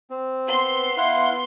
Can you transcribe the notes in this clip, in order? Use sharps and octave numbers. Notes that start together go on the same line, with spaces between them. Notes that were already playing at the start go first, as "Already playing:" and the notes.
C4
B3 C6
E4 F5 F#5